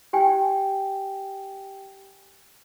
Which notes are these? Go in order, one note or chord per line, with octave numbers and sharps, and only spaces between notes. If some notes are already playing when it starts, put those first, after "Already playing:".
G4 G5 G#5